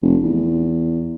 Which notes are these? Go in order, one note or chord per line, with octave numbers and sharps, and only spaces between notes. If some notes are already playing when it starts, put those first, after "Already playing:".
F1
E2